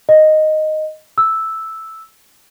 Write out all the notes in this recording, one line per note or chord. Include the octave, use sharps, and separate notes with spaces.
D#5
E6